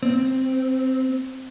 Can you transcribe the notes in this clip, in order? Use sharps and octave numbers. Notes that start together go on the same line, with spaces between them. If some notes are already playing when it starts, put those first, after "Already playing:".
C4